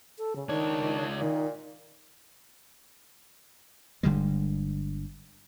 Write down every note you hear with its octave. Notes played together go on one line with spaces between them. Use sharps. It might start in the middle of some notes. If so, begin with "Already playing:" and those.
A4
C#3
C#2 D#3 D4 C#5
A#2 D#3
G1 D3 G3 G#3